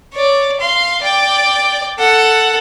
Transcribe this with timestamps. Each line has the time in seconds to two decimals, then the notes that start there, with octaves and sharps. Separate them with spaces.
0.14 C#5 D5
0.60 F5 C6
1.02 D5 G5
1.99 A4 F#5